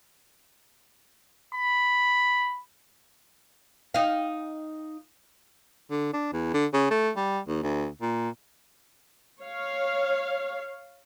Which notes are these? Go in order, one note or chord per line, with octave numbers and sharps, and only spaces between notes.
B5
D#4 F5
D3
D4
E2
D3
C#3
A3
G3
D#2
D2
A#2
C#5 F5